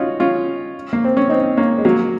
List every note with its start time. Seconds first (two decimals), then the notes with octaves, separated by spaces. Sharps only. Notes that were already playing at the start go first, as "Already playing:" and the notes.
Already playing: C#4 D#4 F4 F#4
0.20 C#4 F4
0.93 A#3
1.04 C4
1.17 C#4
1.29 C4 D#4
1.57 A#3 C#4
1.78 G#3
1.85 F#3 A#3